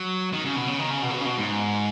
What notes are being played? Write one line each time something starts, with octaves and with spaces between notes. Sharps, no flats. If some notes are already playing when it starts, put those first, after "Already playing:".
Already playing: F#3
D#3
C#3
B2
C#3
D#3
C#3
B2
C#3
B2
C#3
B2
G#2